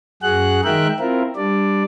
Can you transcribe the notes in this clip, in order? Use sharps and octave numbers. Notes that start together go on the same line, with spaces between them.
F#2 F#4 G#4 F#5 F#6
D#3 G#3 A#4 E5 G5 F#6
C4 E4 F4 A#4
G3 D4 D5